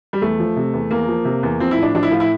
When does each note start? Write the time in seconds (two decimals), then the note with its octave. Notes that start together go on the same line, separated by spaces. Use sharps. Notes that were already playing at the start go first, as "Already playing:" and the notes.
0.13 G3
0.22 E2 A3
0.39 F3
0.56 C3
0.74 E2
0.91 E2 A#3
1.08 F3
1.25 C3
1.43 E2
1.60 F3 C4
1.71 E4
1.78 A2 D4
1.95 F3 D4
2.03 E4
2.11 A2 F4
2.20 E4